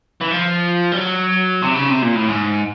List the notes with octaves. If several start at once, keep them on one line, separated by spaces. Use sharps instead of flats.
E3
F3
G3
F#3
C3
C#3
C3
A#2
A2
G#2